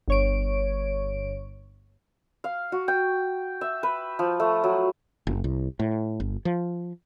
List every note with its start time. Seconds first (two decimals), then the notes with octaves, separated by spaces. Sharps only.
0.08 G1 C#5 D7
2.44 F5
2.72 F#4
2.88 G5
3.61 E5
3.83 B4
4.19 F3
4.40 A3
4.64 F#3
5.27 F#1
5.44 C2
5.80 A2
6.20 G1
6.45 F3